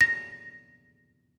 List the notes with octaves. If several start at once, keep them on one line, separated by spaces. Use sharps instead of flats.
A#6